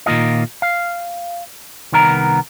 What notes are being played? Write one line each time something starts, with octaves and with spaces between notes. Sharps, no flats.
A#2 D#3 A#3 F4 D#5
F5
C2 D#3 B3 A#4 A#5